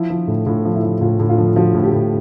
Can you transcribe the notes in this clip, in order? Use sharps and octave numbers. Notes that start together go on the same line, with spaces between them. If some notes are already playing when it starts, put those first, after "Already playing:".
Already playing: F3 E4
F3
A2
A2 F4
F3
E4
F3
A2 F4
A2
F4
F3
F3 F#4
A2
G4
A2